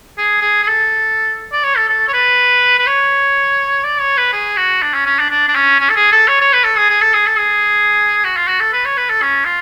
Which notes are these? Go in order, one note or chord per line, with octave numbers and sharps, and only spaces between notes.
G#4
G#4
G#4
A4
D5
C#5
A4
A4
C#5
B4
B4
C#5
D5
C#5
B4
G#4
F#4
D4
C#4
C#4
D4
D4
D4
C#4
C#4
A4
G#4
A4
C#5
C#5
B4
A4
G#4
G#4
A4
G#4
A4
G#4
F#4
F4
F#4
A4
B4
C#5
B4
A4
C#4
F4